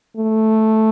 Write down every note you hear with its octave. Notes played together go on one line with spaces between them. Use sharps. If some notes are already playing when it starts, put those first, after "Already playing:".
A3